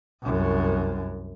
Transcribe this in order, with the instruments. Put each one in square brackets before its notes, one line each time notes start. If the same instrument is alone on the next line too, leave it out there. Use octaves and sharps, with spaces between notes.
[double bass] C2 F#2